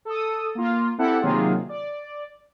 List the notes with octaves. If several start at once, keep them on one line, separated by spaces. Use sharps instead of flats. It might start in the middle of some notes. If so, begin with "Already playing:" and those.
A4 D#6
A#3 F4
C4 E4 G4 A4 F#5
C3 D#3 F#3 A#3 F4 G#4
D5